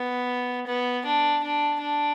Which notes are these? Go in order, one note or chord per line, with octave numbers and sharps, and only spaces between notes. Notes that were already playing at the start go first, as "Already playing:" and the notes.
Already playing: B3
B3
D4
D4
D4